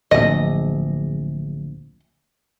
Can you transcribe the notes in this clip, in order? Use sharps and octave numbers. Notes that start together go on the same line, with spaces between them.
D1 A#1 D#5